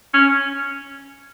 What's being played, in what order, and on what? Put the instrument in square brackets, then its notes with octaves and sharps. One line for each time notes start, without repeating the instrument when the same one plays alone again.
[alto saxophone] C#4